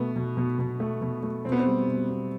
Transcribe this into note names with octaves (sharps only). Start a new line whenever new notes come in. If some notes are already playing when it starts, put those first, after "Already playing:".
Already playing: B2 A3 B3
B2
B2
B2
A3
B2
A3
B2 C4
B3
C4
G3
B2
B3